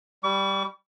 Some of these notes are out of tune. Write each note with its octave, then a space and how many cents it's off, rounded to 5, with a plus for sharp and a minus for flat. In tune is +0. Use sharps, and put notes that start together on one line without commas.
G3 +0 C#6 +45